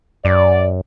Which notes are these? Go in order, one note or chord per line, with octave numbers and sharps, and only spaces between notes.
F#2 D5